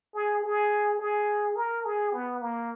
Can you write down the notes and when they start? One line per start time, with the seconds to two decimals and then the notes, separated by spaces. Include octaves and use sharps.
0.15 G#4
0.43 G#4
0.99 G#4
1.56 A#4
1.85 G#4
2.13 B3
2.41 A#3